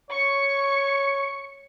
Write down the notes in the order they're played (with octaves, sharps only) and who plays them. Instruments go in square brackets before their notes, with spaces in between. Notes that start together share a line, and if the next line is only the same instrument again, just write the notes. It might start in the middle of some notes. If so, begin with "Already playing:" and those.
[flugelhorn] C#5 [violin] C#6 C#7